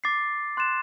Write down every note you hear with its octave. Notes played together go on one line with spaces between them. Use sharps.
D6 A6 C7
C6 F#6 A6 E7